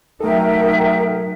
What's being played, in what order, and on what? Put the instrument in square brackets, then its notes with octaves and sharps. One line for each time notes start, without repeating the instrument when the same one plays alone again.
[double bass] F#3 D#4 [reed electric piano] A3 A4 [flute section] A#4 E5 G5